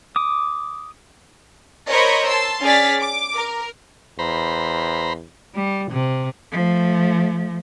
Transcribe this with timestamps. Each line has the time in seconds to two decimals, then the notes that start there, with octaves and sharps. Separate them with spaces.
0.16 D6 D#6
1.90 A#4 C5 C#5 D#5 B5 C#6
2.26 A5 C6 E6
2.63 C#4 G#4 D5 F6 A6 B6
3.00 D6
3.36 A#4
4.19 E2 C5 A#5 B5
5.55 G3
5.91 C3
6.52 F3 A3